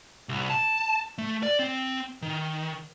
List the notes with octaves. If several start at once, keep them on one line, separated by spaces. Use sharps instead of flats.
C2
A5
A3
D5
C4
D#3